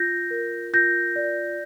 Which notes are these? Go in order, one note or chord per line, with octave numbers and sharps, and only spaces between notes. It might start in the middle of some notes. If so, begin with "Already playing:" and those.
Already playing: F4 G6 A#6
A#4
F4 G6 A#6
D5